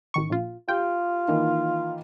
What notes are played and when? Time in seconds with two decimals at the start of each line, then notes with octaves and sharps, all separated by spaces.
0.14 A1 D#3 C#6
0.30 A#1 F4
0.69 F4 G4 G5
1.28 D#3 E3 A#3